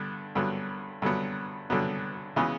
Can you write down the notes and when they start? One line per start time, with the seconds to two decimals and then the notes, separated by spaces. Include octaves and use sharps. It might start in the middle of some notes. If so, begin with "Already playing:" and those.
Already playing: G2 D3 B3
0.35 G2 D3 F#3 B3
1.02 G2 D3 F#3 B3
1.70 G2 D3 F#3 B3
2.36 C#3 E3 G#3 B3